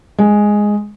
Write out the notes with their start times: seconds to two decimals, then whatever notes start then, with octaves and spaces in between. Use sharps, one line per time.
0.18 G#3